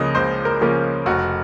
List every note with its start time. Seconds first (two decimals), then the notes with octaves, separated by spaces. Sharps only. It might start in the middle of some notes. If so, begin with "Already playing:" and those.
Already playing: C#2 C#3 F3 A#3 C#4 D#5
0.15 C#2 C5
0.45 A#4
0.61 C#3 F3 A#3 C#4
1.06 F1 F#4